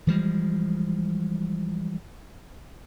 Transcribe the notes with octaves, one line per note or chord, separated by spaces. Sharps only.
E3 F3 G3 G#3